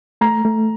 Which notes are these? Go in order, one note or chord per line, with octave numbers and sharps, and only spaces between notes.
A3 A#5
A3